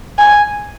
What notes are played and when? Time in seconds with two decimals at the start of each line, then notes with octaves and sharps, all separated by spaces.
0.19 G#5